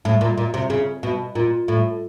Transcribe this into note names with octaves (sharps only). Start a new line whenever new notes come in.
A2
A#2
A#2
C3
C#3
B2
A#2
A2